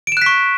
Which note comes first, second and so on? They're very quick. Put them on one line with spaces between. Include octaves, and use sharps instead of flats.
D7 E7 F#6 B6 C#6